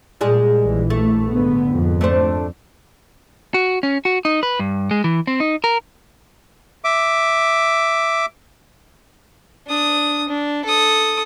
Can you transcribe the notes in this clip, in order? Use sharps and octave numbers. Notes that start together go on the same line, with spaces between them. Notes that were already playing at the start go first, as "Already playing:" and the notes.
A#2 G3 G#3 G#4
A#1 E3
A3
G#2 D3 B3
F2 G#2
A3 D4 C5
F#4
C#4
F#4
D#4
B4
G2
G#3
E3
C4
D#4
A#4
E5 D6
D4 D#6
D4
A4 D#6